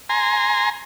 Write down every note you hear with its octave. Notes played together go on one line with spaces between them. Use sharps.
G#5 A#5 C6